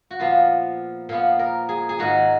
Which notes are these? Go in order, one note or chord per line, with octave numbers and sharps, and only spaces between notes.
F#4
A#2 F3 B3 F4
A#2 F3 B3
A#4
G#4
G#4
G#2 D#3 F#3 F#4